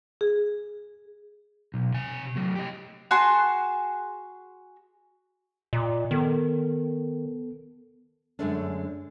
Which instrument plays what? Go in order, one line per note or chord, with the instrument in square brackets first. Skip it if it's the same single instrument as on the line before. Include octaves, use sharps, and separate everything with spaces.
[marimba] G#4
[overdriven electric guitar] B1
C3 G#5
F#3 A3
G4 D#5
[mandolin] F#4 G#4 A5 C6
[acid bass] A#2 [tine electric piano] D#5 A#5 D6
[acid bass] D#3 [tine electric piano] B3 A4
[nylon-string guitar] F#2 D3 G#3 A3 C#4 D4